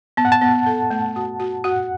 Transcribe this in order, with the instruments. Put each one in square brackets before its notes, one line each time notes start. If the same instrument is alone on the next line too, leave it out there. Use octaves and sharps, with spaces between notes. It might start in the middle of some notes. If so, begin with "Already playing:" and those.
[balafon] B3 [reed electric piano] A5
[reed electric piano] F#5
A5
[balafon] B3
A4
A3
F#4
F#4
[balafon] F#4 [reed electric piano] F#5